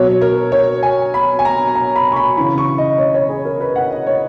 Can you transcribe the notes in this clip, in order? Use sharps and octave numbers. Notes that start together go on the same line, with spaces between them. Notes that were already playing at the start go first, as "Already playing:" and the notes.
Already playing: B2 F#3 C#5
A#4
C#5
G#5
B5
G#5
A#5
A#5
B5
C#6
B5
C#3 E3 B5
C#6
D#5
C#5
C#5
G#4
A#4
B4
F#5
D#5
C#5